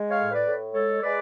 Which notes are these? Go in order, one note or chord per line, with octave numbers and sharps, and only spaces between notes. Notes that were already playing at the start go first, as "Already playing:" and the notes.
Already playing: G#3
C#5 F5
A2
B4 D5
A2
G#3 A4 C#5
G#3 B4 D5